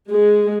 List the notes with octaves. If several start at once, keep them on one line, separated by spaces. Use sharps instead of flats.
G#3